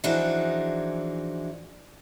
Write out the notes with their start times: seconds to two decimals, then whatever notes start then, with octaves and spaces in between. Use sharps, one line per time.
0.04 E3 F3 D4 D#4 F#4 G#4